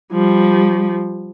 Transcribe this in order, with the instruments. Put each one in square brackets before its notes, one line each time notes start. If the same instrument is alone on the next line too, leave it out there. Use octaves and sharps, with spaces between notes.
[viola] F3 G3